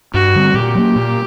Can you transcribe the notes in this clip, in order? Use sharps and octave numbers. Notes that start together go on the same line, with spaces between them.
G2 F#4
D3 G3 C4
A#2 G4
F#3 A#3
A#2